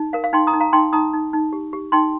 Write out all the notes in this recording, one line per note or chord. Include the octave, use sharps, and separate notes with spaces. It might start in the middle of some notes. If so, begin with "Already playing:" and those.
Already playing: D#4
A#4 F5
F5
D#4 G5 C6
A#5 D#6
D#4
F5 A#5
D#4 G5 C6
D#4 A#5 D#6
D#4
D#4
G4
G4
D#4 G5 C6